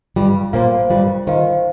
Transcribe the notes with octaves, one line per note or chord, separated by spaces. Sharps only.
G2 G3 F4
A#2 A#3 C5 F5
G2 G3 F4
D#3 C5 F5